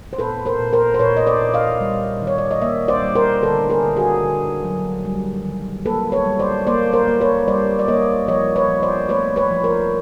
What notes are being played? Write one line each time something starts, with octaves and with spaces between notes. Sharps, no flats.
C5
A#2 A4 B4
A#4 C5
A#2
A#4 C5
C5
A#2 B4 C#5
D#5
C5 D5
A#2
D#5 F5
G3
D#3
C#5
D5
D#5
A#3 D5 E5
C5 D5
G3
A#4 C5
D3 A4 B4
G#4 A#4
D3
F#4 G#4
D3
F#3
G3
D#3
A#3 A4 B4
B4 C#5
G3
C5 D5
A#3 C5 D5
A#4 C5
A#3
B4 C#5
G3 C5 D5
D5
A#3 C#5 D#5
F3 C#5 D#5
B4 C#5
F3
C5 D5
A3 B4 C#5
B4 C#5
F3
A#4 C5